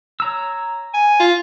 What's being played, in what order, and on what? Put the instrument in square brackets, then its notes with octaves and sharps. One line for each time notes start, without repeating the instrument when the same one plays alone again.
[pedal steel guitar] C#5 A#5 E6
[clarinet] G#5
[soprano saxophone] F4